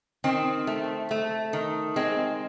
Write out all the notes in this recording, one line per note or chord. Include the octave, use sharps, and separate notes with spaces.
D#3 C4
A3
A3
D#3
G#3 C4